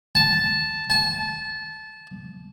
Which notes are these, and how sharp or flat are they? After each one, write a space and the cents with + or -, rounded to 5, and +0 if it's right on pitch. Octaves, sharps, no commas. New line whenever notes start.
A5 -5
A5 -20